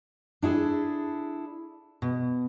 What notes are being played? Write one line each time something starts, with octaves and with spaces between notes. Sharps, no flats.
D4 E4 G#4 A4
B2